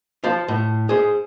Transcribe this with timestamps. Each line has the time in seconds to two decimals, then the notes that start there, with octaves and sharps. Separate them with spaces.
0.24 F4 C5 A5
0.48 A2
0.89 G#4 C5